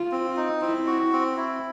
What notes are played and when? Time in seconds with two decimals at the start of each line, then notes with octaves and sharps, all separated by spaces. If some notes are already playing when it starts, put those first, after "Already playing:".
Already playing: F4
0.12 C4
0.37 D#4
0.62 C4 E4
0.87 F#4
1.12 C4
1.37 E4